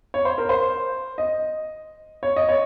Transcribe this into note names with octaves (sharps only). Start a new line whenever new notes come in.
C#5
C5
A#4
C5
D#5
C#5
D#5
C#5